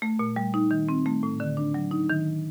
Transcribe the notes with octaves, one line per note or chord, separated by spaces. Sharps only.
A3
A#2
G3
D#4
D#3
C4
A3
A2
D3
D4
F#3
D#4
D#3